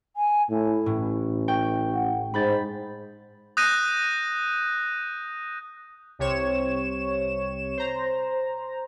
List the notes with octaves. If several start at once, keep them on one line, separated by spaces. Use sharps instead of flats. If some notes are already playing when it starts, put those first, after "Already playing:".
G#5
A2 E4
A1 A2
G5 C#6
F#5
G#2 C5 B5 G6 A6
D#6 F#6 G6 A#6 D#7
C2 C3 C#5 E7
C5 A#5